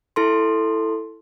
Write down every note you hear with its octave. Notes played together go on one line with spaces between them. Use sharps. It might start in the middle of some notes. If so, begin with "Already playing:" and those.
E4 A4 C6